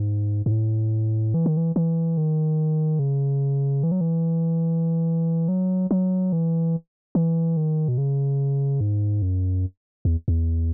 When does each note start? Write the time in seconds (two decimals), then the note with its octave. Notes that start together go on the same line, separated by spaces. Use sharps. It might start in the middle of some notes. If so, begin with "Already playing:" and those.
Already playing: G#2
0.46 G#2
0.51 A2
1.34 E3
1.46 D#3
1.57 E3
1.76 E3
2.17 D#3
2.99 C#3
3.83 E3
3.92 F#3
4.01 E3
5.48 F#3
5.91 F#3
6.32 E3
7.15 E3
7.57 D#3
7.88 B2
7.98 C#3
8.81 G#2
9.22 F#2
10.05 E2
10.28 E2